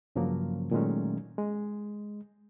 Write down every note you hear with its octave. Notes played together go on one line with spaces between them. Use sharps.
G2 C#3 F3 F#3 A#3
A#2 D#3 F#3 G#3 A3 C#4
G#3